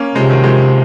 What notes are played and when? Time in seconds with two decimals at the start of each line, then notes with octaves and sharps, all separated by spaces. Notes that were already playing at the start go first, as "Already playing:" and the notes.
Already playing: A#3 C#4
0.15 C3 F3 G#3
0.30 D#3 F#3
0.44 F3 G#3